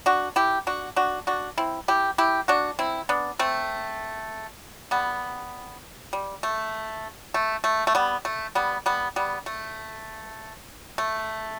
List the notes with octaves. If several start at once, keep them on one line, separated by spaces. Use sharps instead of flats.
D4 F#4
E4 G4
D4 F#4
D4 F#4
D4 F#4
C4 E4
E4 G4
E4 G4
D4 F#4
C4 E4
B3 D4
A3 C4
G3 B3
G3
A3
A3
A3
A3
G3 B3
A3
G3 B3
G3 B3
G3 B3
A3
A3